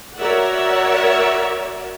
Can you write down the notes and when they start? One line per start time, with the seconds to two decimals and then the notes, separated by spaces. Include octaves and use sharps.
0.17 F#4 A#4 C#5 D5 E5 F#5